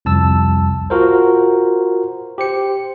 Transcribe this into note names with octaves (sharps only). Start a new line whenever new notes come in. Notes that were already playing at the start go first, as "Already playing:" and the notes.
C2 F2 A5 E6
F4 F#4 A#4 C5
G4 C5 C#7